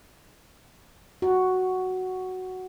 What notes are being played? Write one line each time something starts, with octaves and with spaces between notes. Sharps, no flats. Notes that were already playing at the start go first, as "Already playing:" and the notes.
F#4